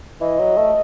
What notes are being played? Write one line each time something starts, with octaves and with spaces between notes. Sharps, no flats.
E3 D#5
F#3
A3